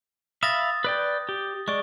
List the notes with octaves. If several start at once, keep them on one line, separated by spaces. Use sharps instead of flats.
E5 F5 B5 D#6 A6 A#6
B4 D5 G5
G4
G#3 D5 C#6